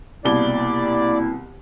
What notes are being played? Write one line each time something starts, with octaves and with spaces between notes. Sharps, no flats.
C2 B2 A#3 E4 D5 G7